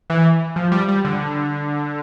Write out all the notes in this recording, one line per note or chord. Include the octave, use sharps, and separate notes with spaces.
E3
F3
G3
G3
D3